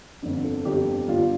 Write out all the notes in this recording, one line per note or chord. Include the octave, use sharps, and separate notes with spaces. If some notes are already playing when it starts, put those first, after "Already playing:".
G1 F2 D3
A4
G1 F2 D3 G4
G1 G2 D3 F4